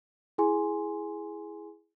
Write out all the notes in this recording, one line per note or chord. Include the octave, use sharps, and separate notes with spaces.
E4 G#4 G#5 C6